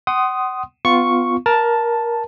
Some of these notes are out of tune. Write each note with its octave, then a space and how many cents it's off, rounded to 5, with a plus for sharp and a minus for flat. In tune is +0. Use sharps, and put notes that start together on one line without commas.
F#5 +30 C6 +0 D#6 +0
B3 +25 F4 +0 C#6 +0
A#4 +15 A5 +0